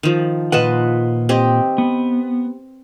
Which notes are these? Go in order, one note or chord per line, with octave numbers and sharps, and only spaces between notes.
D#3 F3
A#2 F4 B4 D#5 F#5 A5
C4 G4 D#5
B3